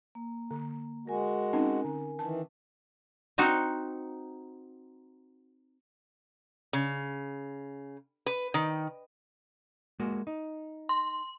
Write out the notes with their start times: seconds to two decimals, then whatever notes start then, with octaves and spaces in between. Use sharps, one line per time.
0.15 A#3
0.51 D3
1.07 G#3 F#4 A#4 G#5
1.53 C4 C#4 D#4
1.84 D3
2.19 D#3 E3 A5
3.38 C4 D#4 F#4
6.73 C#3
8.26 B4
8.54 D#3
10.00 G#3 A#3 F#4
10.27 D#4
10.89 C6